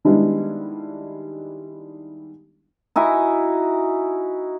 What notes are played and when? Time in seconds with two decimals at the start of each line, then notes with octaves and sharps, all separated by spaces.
0.05 D#3 G3 G#3 B3 D4 E4
2.96 D#4 E4 F#4 G#5